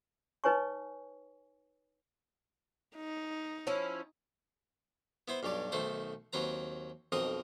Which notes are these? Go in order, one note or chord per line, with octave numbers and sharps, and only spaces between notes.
D#4 B4 C#5 G#5 C#6
D#4
F3 C#4 E4
B3 E4 C5
B1 G2 F#3 G3 D5
B1 D#3 A3 A4 C5
D#2 F#3 C4 B4 A#5
B1 F2 C4 A#4 D#5 D#6